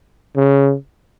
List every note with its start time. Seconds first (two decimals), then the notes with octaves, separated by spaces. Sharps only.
0.36 C#3